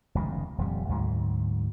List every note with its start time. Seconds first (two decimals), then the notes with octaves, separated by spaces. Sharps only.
0.15 F1 C#2 B2 D#3
0.58 D#1 F2 G3
0.89 D2 G#2 F#3